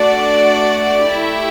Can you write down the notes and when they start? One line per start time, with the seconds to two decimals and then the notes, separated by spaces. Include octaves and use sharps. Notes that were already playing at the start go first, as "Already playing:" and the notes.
Already playing: A3 D4 F#4 D5
1.10 A3 E4 G4 E5